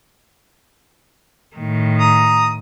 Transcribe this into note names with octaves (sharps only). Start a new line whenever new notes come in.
A2 D#3
A#5 D#6